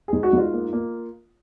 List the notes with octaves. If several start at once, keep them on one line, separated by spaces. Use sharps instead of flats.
G#2 G#4
F#4
G#2 F4
A#3
A#3